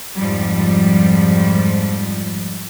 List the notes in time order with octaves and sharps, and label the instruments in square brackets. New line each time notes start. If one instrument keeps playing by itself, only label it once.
[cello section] F2 G#2 F3 G3